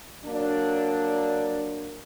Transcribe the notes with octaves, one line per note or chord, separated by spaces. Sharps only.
F#3 A#3 D4